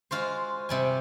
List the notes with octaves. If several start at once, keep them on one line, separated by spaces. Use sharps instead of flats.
G#3 F4 F#4 C5
C3 G3 G#5